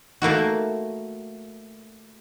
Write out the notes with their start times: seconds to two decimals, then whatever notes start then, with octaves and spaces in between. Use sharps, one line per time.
0.22 A3 A#3 E4 F#4